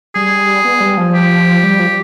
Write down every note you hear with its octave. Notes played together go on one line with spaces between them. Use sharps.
G3 G#4
B3
G3
F3
G4
G3
F3